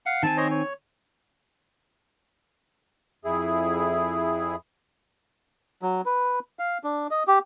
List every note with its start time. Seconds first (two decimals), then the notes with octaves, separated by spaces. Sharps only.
0.06 F5 F#5
0.23 D#3 C4 G#5 A5
0.37 C5 C#5 D#5
0.51 C#5
3.25 F2 E4 G#4
5.82 F#3
6.06 B4
6.59 F5
6.84 D4
7.11 D#5
7.27 G4